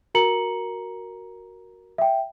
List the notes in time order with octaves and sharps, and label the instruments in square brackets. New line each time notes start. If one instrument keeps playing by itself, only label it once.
[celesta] F#4 A#4 A#5 C#7 F#7
E5 G5